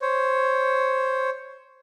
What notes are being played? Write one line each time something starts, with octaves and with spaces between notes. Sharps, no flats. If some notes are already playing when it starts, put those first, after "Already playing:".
C5 C#5